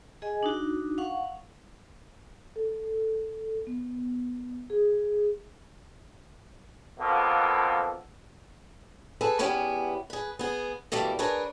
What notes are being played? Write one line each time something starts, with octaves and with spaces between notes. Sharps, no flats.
G#4 D#5 G#5
D4 D#4 F#4
F5 F#5 C#6
A4
B3
G#4
F2 B2 A#3 A4
G#4 A4 B4
E2 B3 C#4 E4 G4 G#5
G#4 B4
B3 G#4
B2 E3 G3 A3 A#3
D4 G#4 A#4 B4 C#5